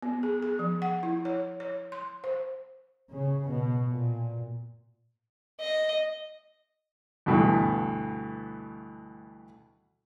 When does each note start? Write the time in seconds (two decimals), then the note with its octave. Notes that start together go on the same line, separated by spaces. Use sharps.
0.02 B3
0.23 G#4
0.43 G#4
0.59 F3
0.82 F#5
1.03 E4
1.25 C#5
1.60 C#5
1.92 C6
2.24 C5
3.12 C#3
3.50 B2
3.88 A#2
5.61 D#5
7.26 D2 G2 B2 E3